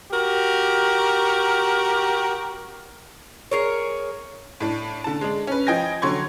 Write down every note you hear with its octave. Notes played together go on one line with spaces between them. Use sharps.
F#4 G4 A#4
G#4 A#4 C#5
A2 D4
D3 A5
G#3 D4
C#4 B4
F3 D#5 G5 G#5 G#6 A#6
D3 F#3 C6 C#6 G#6